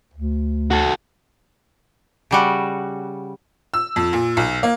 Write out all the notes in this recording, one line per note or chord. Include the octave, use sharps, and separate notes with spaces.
D2
F#4 A4
C#3 G3 F#4
E6
F2
A#2
B1
A#3